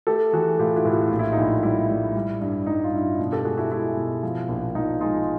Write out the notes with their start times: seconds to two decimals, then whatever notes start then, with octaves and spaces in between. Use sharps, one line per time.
0.07 A3 G4 A4
0.33 E3 F#4 G#4
0.59 A2 F4 G4
0.76 E4 F#4
0.85 A2
0.93 F#4
1.07 A#1 F4
1.19 E4
1.32 D#4 F4
1.38 A#1
1.63 G3 E4
1.89 G3
2.15 G3
2.41 G2
2.67 G3 D#4
2.84 F4
2.93 G2 E4
3.19 B2
3.32 G4 A4
3.44 G#3 F#4 G#4
3.57 E4 F#4
3.71 G#3 E4
3.97 B2
4.23 F3
4.48 A#1
4.75 F3 D#4
5.01 G#3 D#4 F4